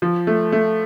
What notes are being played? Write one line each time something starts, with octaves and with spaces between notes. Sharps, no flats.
F3
A3
A3